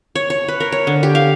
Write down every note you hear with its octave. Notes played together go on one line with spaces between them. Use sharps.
C#5
C#5
B4
A#4
C#5
D3
G4
F5